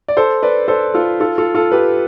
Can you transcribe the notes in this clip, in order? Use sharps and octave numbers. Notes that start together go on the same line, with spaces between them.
D5
A4 C5
B4 D5
A4 C5
F4 A4
F4 A4
F4 A4
F4 A4
G4 B4